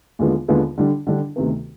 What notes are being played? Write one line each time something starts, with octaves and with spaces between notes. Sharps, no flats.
D#2 D3 G#3 B3 F4
D#2 D3 G#3 B3 F4
D3 G3 D4
D3 G3 D4
D2 C3 D#3 B3